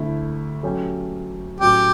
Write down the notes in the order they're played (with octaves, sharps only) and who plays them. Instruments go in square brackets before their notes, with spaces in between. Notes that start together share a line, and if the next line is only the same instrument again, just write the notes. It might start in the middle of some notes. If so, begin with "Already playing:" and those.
Already playing: [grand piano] D2 D3 A3 E4
F#3 A3 C#4 G4
[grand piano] A2 F#3 C#4 F#4 B4 [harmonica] G4